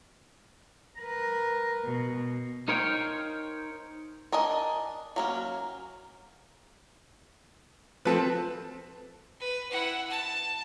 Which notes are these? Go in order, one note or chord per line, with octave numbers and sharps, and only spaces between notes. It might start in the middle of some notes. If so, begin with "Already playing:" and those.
A#4 B4
B2
D#4 A#4 C5 C#5 F5 G5
D4 A#4 D#5 G#5
F#3 A#3 C#4
F3 C4 A4 B4
B4
E4 F#5
A5